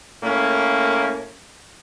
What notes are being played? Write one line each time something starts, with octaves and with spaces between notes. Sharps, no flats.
A2 A#3 C#4